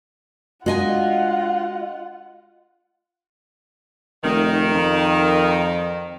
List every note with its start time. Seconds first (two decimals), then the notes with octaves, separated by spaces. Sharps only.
0.66 G#3 D4 F4 F#4 D#5 F#5 G#5
4.23 F1 D#3
4.74 F2